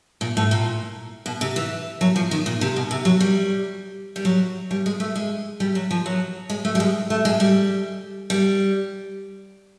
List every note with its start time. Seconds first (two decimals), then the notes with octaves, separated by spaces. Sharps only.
0.21 A#2
0.37 A2
0.51 A#2
1.26 B2
1.41 C3
1.56 E3
2.01 F#3
2.16 F3
2.31 D#3
2.46 A#2
2.61 C3
2.76 B2
2.91 C3
3.05 F#3
3.20 G3
4.16 G3
4.25 F#3
4.71 G3
4.86 G#3
5.00 A3
5.15 G#3
5.60 G3
5.75 F#3
5.91 F3
6.06 F#3
6.50 G#3
6.65 A3
6.75 G3
6.80 G#3
7.10 A3
7.25 G#3
7.40 G3
8.30 G3